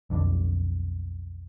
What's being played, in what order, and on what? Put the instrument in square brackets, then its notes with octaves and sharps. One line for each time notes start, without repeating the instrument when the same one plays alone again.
[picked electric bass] B1 F2 D3